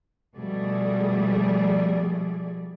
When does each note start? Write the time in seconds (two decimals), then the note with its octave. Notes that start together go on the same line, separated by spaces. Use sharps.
0.36 B2 F3 G3 A3 G#4 D5